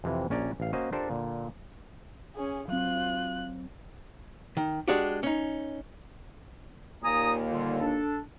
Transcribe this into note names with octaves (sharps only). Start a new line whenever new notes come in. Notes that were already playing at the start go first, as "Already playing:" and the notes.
F2 C3 E3
A#1 C#4 G4 D5 A#5
A1 F5
A#3 C#4 F#4 C5 D#5
D4 F4 G4 A4 A#4 C5
A#2 D3
C#4 G#4
F#3 C4 F4 F#6
D#3
G#3 D4 F#4 G4
C#4 D#4
D#2 A#2 A#3 G#5 A#5 D#6
D3 G3 F4
D4 A4